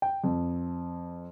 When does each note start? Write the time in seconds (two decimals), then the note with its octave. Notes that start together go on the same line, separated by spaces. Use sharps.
0.02 G5
0.24 F2